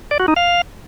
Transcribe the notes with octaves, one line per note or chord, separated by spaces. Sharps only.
D5
F#4
D#4
F5